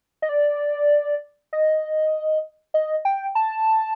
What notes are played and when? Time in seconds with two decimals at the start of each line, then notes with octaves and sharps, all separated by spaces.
0.22 D#5
0.29 D5
1.53 D#5
2.74 D#5
3.05 G5
3.35 A5